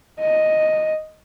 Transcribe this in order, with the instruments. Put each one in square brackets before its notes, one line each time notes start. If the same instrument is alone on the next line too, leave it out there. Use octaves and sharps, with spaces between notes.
[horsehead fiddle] D#5